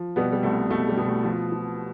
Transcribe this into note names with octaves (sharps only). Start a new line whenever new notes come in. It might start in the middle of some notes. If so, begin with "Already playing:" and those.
Already playing: F3
B2 G3 B3
G3
C2 A3
B2 A3
G3
B2
A3
F3
F3